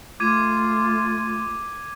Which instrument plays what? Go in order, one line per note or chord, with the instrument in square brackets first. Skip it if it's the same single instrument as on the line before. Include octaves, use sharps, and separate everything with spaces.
[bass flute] A3 [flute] F4 [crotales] D6 G#6 D#7